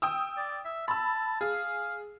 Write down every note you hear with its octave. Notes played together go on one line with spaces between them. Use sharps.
G5 D#6 E6
D5
E5
A5 B5 E6
G#4 F5